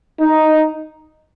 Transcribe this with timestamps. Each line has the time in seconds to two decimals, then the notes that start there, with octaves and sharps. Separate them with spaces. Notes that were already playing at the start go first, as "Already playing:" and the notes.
0.20 D#4